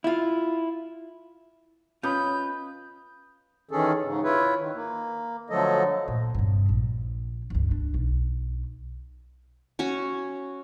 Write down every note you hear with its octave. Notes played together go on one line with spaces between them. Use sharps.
E4 F4
C#4 F4 B4 D#5 B5 G6
D#3 E3 C#4 G#4 A4
G#2 C#3
E4 F4 B4 C#5 E5
D#3
A#3
D3 F3 F#3 A3 A4 D#5
A#2
G2 C3
A#1
G1 C#2
D4
B1
C#4 F#4 C#5